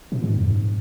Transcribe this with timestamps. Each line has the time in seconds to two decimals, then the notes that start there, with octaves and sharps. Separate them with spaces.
0.12 A#2
0.24 G#2
0.37 F2
0.49 G#2